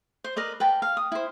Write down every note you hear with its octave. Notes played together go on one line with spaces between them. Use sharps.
C5
A#4 B4 D5 D#5
B4 G5 A5
F5
D#6
E4 C5